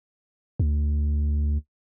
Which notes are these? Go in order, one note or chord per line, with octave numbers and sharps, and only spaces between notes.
D2